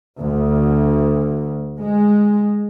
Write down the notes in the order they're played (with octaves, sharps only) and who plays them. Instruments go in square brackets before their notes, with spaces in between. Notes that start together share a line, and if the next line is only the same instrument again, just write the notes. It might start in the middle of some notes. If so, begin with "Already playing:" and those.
[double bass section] D2
G#3